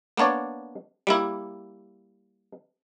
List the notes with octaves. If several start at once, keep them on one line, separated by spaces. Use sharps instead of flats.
A#3 B3 D4 C#5 D5
G3 A#3 E4